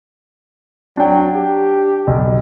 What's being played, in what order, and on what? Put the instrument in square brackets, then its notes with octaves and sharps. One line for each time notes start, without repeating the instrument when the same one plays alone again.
[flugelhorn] F#3 [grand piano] D4 G5
[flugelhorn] G4
[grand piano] B1